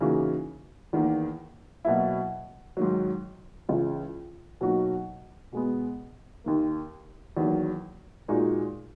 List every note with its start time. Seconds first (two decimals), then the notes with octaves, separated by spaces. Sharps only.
0.01 C#3 E3 A#3 D#4 F#4
0.93 E2 D#3 A#3
1.85 B2 F#3 A#3 E4
2.77 G#2 D#3 F#3
3.69 C#2 C#3 E3
4.61 B2 F#3 A#3 D#4 F#4
5.52 B2 G#3 B3
6.44 D#2 D#3 A#3
7.37 E2 D#3 F#3 A#3
8.28 A#2 G#3 D#4 F#4